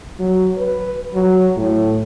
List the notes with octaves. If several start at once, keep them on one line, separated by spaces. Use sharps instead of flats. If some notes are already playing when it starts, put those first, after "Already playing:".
F#3
B4
F#3
A2